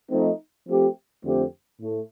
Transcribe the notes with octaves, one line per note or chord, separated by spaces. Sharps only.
F3 A3 C4 D#4
F3 A3 C4 G4
F2 D3 A3 C4 G4
A2 A3